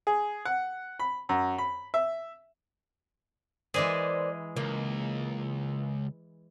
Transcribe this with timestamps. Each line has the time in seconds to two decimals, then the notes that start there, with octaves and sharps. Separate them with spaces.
0.07 G#4
0.45 F#5
0.99 B5
1.29 F#2
1.58 B5
1.94 E5
3.74 E3 G#3 A#3 G#4 C5 D5
4.56 C#2 A#3